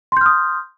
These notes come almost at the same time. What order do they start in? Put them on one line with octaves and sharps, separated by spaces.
C6 G6 F6 D#6